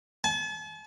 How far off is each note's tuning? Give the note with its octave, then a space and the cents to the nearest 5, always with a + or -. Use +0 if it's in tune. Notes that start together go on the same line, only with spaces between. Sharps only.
A5 -45